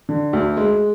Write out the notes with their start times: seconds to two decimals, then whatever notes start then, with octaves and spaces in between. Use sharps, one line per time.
0.09 D3
0.33 D2
0.57 G#3